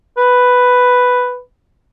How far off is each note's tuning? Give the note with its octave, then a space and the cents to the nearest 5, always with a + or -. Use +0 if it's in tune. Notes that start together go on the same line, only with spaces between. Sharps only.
B4 +5